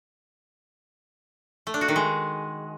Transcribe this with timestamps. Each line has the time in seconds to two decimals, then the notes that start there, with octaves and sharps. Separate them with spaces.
1.67 A3
1.74 D4
1.81 F#4
1.88 D#3
1.96 G#3